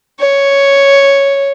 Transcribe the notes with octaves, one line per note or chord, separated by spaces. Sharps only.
C#5